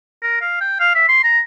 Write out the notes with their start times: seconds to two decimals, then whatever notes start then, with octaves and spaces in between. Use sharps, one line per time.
0.22 A#4
0.41 F5
0.61 G5
0.80 F5
0.95 E5
1.09 C6
1.24 A#5